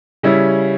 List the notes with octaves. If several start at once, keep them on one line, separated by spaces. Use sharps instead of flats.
C#3 G3 C#4 E4